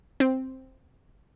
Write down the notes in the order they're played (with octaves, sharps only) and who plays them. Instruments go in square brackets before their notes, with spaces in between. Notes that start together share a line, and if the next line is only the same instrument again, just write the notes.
[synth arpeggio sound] C4